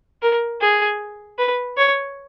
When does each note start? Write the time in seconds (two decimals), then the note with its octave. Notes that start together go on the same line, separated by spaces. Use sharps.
0.22 A#4
0.61 G#4
1.38 B4
1.77 C#5